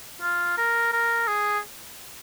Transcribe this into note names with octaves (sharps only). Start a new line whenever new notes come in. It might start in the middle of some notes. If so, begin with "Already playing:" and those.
F4
A#4
A#4
G#4